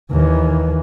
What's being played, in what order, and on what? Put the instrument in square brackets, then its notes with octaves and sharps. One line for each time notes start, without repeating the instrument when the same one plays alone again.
[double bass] D#2 E3